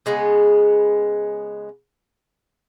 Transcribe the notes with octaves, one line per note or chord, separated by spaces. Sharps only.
C#3 G#3 B3